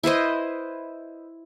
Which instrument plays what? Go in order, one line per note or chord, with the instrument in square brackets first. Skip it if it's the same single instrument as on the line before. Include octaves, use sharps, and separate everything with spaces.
[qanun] E4 B4 C5 D#5